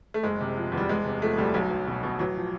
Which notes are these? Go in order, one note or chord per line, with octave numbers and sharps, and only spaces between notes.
A3
F#1 G#3
C3
F3
E2
G3
E1 G#3
C3
F3 A3
D2 G3
B1 F#3
B1
B2
B2
A1 F#3
F3